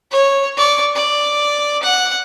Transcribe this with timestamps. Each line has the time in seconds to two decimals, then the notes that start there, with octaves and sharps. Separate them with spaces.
0.12 C#5
0.57 D5 C#6
0.95 D5
1.83 F#5